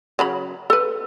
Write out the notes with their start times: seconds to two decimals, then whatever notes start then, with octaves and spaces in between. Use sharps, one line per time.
0.19 C#3 F#3 B5
0.70 A4 B4